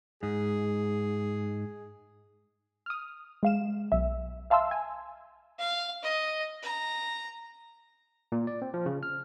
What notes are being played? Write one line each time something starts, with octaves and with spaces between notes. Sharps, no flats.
G#2 G#4
D#6 F6
G#3 F5 E7
B1 E5
E5 F5 A5 C6 E6
G#5
F5
D#5
A#5
A#2
D5
C4
F3
C#3
F6